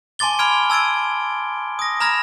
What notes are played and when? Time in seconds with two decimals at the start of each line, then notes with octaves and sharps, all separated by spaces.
0.19 G#5 A5 C6 D6 A6 G7
0.39 B5 F6 G#6 D7
0.70 A5 E6 G#6 A6 D7
1.79 D#6 A#6
2.00 A#5 B5 F6 G#6 A#6